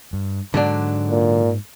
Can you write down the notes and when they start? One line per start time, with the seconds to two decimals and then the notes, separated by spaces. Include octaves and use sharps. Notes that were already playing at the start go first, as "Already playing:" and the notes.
0.13 G2
0.54 G#2 D3 F#3 D4
1.10 A#2